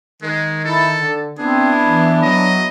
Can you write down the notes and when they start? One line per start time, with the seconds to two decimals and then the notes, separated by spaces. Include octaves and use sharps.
0.22 D#3 G#3
0.64 E4 A4
0.93 D3
1.38 B3 C4 D4 E4 G#4
1.84 E3
2.23 F#3 D#5